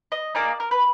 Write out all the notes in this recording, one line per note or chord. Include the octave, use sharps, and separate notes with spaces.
D#5
A#3 D#4 G#4 D5
A#4
B4